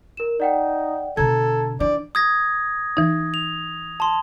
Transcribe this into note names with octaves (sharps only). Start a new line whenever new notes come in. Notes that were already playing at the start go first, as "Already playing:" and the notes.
A#4 E7
D#4 D5 F#5 G5
B2 D3 A4 A#5 G#6
E3 D4 D5
D#6 G#6 A#6
E3 D#4
F7
A5 C6